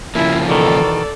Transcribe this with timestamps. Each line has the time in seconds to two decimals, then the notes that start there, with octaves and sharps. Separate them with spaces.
0.15 C#3 F3 A#3 E4
0.49 E2 B2 D#3 A4 D5